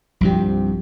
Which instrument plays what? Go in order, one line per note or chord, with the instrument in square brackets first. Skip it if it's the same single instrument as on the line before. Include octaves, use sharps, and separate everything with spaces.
[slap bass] C2 G2 C3 [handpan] F3 G4